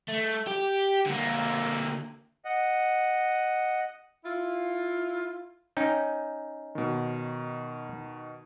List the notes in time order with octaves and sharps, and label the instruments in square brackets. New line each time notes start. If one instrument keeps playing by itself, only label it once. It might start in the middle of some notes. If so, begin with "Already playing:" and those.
[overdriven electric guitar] A3
G4
D3 A#3
[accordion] D#5 F#5
[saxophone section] E4 F4
[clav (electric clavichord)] C#4 D#4 G5
[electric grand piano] B2 D#3